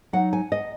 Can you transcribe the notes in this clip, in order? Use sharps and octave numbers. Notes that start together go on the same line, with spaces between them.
F#3 D#4 F#5
G#5
D#5